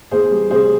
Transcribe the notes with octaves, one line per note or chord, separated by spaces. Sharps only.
E2 G#4 C5
G3
C3 G#4 C5